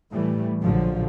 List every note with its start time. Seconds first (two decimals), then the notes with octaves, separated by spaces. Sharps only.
0.12 A2 E3 G3 A3
0.63 A#1 D3 F3 F#3